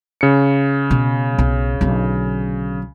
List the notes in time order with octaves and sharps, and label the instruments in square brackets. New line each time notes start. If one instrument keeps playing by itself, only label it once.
[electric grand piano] C#3 C#7
[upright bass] B2
B1
B1 D3